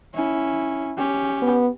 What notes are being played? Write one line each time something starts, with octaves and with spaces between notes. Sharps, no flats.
C#4 E4
C#4 G4
B3